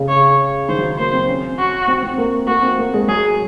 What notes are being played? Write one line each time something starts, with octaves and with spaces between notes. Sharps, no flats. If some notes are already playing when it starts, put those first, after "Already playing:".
Already playing: C#3
C#5
D#3 C5
F#3
A#3 C5
C4
C#4
F#4
C4
C4
A#3
A#3 F#4
C4
A#3
G#3
F#3 G#4